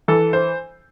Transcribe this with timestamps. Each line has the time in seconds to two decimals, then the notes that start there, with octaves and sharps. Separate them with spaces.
0.08 E3 A4
0.33 C5